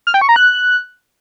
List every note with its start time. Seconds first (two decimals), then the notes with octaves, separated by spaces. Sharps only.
0.07 F6
0.14 G5
0.21 C#6
0.29 A#5
0.36 F#6